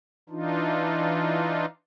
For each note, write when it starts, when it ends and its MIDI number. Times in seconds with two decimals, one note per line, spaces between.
0.30 1.65 52
0.30 1.65 62
0.30 1.65 63
0.30 1.65 65